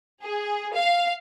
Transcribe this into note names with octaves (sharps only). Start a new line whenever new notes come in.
G#4
F5